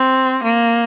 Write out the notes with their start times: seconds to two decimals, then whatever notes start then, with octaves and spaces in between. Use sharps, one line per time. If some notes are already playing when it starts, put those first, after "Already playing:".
Already playing: C4
0.44 A#3